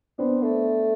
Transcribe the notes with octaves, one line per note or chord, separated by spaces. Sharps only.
B3 C4 D4
A3